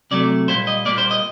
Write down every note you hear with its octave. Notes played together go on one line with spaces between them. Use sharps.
C3 F#3 A3 D5
A#2 G3 A#3 C5
D#5
A#2 G3 A#3 D5
C5
D#5